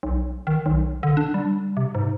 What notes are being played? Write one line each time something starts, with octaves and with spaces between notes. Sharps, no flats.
B1
D#3
B1
D3
D4
G3
C3
G#2